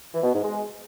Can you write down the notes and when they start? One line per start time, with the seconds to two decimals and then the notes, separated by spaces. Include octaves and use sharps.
0.14 E3
0.23 B2
0.33 G#2
0.43 G#3